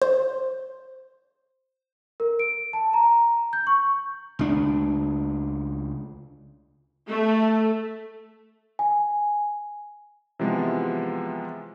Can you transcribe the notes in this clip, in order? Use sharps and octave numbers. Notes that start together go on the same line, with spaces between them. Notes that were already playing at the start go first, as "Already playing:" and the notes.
C5
A#4
D7
A5
A#5
G6
C#6
C#2 D4
A3
G#5
C3 E3 F3 G#3 B3